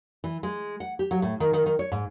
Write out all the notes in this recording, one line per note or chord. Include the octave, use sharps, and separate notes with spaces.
E3
G#3
F#5
G4
F#3
A2
D#3
D#3
D#3
C#5
G#2